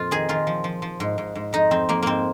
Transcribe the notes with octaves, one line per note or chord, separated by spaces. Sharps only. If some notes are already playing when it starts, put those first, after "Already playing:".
Already playing: F2 A#2 F4
D#3 G#4
D#3 F4
F3
F3
F3
G#2
G#2
G#2
F2 D#4
F2 C4
F2 A#3
G#2 A#3 C4